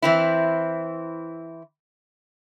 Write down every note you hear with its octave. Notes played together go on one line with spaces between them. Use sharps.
E3 C4 E4